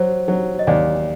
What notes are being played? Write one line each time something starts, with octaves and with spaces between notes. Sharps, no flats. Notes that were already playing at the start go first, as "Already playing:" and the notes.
Already playing: F#3 C5
F#3
D#5
D#2 D5